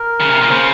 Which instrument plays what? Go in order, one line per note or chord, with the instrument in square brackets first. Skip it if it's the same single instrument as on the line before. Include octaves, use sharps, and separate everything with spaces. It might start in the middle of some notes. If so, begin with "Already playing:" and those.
Already playing: [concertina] A#4
[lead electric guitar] C#3
C3
A#2
[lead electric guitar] C#3 [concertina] C5